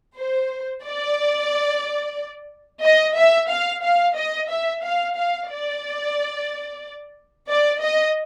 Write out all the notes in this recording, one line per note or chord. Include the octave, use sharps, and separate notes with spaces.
C5
D5
D#5
E5
F5
F5
D#5
E5
F5
F5
D5
D5
D#5